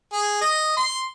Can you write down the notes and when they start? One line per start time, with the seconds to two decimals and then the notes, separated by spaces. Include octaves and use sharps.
0.13 G#4
0.41 D#5
0.77 C6